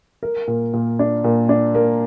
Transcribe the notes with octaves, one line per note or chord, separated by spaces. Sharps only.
A#4
A#2
A#2
D4
A#2
D4
A#3